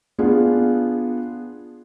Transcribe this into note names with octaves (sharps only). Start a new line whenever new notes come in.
B3 D4 F4 G#4